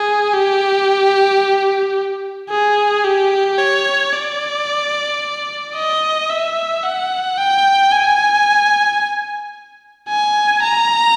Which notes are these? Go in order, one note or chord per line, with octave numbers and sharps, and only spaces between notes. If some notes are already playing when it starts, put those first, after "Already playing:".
Already playing: G#4
G4
G#4
G4
C#5
D5
D#5
E5
F#5
G5
G#5
G#5
A#5